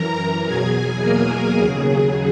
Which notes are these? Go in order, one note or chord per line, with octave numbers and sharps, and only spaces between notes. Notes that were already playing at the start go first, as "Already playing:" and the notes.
Already playing: F#2 E3 A#4 A#5
E2 B2 F#3 G#4 G#5
A#3 A#4
D#2 C#3 F#3 G#4